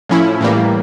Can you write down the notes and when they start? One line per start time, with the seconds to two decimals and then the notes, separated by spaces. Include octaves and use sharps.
0.09 A2 F3 C#4 E4
0.41 A2 E3 G3 A#3